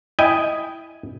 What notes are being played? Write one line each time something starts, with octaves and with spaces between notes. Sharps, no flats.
E4 D#5 G5 G#5